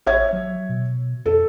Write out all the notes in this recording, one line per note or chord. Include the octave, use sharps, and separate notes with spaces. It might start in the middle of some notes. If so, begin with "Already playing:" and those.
A1 C#5 E5 G#6
F#3
B2
F2 A4